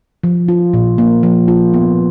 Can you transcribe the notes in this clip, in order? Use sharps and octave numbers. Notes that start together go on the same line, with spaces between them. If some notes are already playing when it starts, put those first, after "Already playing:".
F3
F4
A#2
A#3
F3
F4
B3